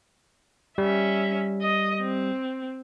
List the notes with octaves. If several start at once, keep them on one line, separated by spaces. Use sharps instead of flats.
G3 C#4 E5
D#5
C4